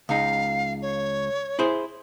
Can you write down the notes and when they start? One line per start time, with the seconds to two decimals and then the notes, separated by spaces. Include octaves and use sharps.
0.09 C#2 D#4 F5
0.82 C#5
1.59 E4 G#4 C5